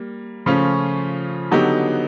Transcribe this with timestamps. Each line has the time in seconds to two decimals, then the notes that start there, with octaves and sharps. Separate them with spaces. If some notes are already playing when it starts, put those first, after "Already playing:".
Already playing: G3 A#3
0.46 C#3 F3 A3 C#4 F4
1.51 D3 F#3 B3 D#4 G4